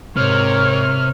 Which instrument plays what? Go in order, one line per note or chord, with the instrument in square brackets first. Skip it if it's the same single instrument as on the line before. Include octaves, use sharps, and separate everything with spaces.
[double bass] G#2 [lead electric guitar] C3 [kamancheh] A#4 C#5 [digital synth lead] F6